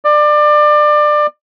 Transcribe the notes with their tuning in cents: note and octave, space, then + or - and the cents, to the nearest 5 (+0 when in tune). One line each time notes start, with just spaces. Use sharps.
D5 +25